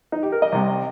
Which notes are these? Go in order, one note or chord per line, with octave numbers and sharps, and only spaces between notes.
D#4
G4
A#4
D#5
C2 C3 G3